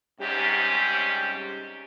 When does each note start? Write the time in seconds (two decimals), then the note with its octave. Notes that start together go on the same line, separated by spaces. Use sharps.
0.20 G#2 C3 G3 C#4 G4